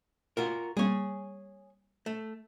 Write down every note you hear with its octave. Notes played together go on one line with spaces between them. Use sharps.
F4 F#4 A#4
G3 A#3 C4 G#4 C#5
A3